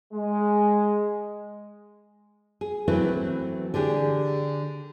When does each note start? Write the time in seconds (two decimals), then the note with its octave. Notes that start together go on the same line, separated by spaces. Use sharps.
0.13 G#3
2.61 G#4
2.88 E3 F#3 A3 C4 E4 B4
3.74 D3 D4 G4 G#4